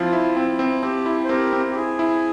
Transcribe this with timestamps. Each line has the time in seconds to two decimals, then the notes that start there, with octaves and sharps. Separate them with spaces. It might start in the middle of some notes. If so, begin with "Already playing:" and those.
Already playing: F3 C4 E4 F4
0.13 E4
0.37 C4
0.59 C4
0.83 C4 G4
1.06 E4
1.24 C5
1.29 C4 G4 A#4
1.53 C4
1.71 G4
1.76 E4 G#4
1.99 E4